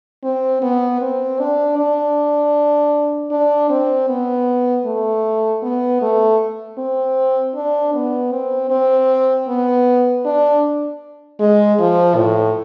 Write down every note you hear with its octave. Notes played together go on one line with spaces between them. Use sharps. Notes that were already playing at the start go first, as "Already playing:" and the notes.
C4
B3
C4
D4
D4
D4
C4
B3
A3
B3
A3
C4
D4
B3
C4
C4
B3
D4
G#3
F3
A2